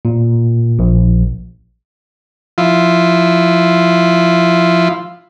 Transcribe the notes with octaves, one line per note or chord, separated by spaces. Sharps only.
A#2
A#1
F3 E4 F4